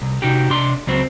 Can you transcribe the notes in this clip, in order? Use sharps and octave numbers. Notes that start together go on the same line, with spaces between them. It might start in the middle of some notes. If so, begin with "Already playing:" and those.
C2
C3 D#4 F#4 G4
C3 D4 C6
C#2 F#3 C4